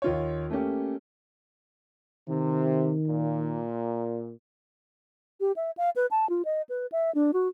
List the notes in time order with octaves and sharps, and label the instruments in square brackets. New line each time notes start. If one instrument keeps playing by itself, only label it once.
[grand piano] D#2 F4 C#5
A3 A#3 C#4 G4
[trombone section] C3 [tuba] D#3
[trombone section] A#2
[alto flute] G4
E5
F5
B4
A5
F4
D#5
B4
E5
D4
F#4